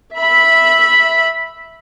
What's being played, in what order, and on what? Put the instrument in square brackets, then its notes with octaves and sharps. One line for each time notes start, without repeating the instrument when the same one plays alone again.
[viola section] E5 B5